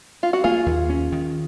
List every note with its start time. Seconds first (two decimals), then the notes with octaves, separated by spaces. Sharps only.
0.23 F4
0.33 F#4
0.44 A#3 F4 G#4
0.66 D#2
0.90 C#4
1.12 D#3